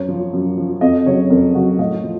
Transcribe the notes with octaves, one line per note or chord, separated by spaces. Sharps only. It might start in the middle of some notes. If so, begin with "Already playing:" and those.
Already playing: F#2 C#5
F3
F#2
F3
F2 D#5
C#3 F#3 C#5
F2 A#4
C#3 F#3 F#4
A2 D#5
F3